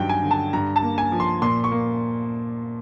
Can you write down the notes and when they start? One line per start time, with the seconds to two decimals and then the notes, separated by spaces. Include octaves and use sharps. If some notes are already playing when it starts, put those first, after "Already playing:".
Already playing: G2 D#3 F#3 G5
0.09 G#5
0.24 D3
0.31 A5
0.53 G2 A#5
0.76 A5
0.83 A#3
0.98 G#5
1.12 F3
1.20 C6
1.42 A#2 C6
1.64 C#6
1.72 A#3